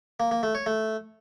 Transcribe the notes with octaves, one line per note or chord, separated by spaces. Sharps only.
A#3
A#3
A3
C#5
A3